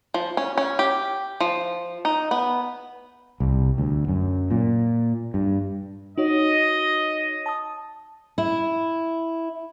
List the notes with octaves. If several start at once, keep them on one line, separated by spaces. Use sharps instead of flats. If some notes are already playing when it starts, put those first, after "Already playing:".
F3
C#4
C#4
G4
F3
D#4
B3
C2
D2
F#2
A#2
G2
D#4 F#4 C#5 D#5
A5 D#6
E4